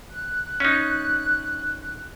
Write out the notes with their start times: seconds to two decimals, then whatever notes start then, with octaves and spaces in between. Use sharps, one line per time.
0.10 F#6
0.60 C#4 D#4